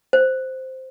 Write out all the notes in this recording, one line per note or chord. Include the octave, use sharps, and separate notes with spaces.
C5